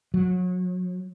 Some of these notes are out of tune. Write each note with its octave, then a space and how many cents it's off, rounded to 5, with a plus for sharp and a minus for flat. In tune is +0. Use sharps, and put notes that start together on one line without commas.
F#3 -30